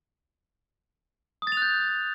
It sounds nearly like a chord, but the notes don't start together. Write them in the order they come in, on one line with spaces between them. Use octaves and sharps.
D#6 A6 F7 F#6 G6